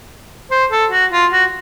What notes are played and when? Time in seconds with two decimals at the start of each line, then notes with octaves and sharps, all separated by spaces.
0.51 C5
0.72 A4
0.91 F#4
1.12 F4
1.33 F#4